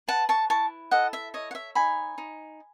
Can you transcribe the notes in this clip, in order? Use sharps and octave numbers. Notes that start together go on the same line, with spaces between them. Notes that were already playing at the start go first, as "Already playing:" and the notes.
B4 F#5 A5
A5 C#6
E4 A5 C#6
A4 D#5 F#5
E5
C#5 D#5
F#5
E5
D#4 G#5 B5
D#4